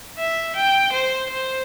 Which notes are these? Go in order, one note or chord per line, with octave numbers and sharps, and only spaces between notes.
E5
G5
C5
C5